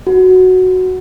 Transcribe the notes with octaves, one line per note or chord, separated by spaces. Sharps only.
F#4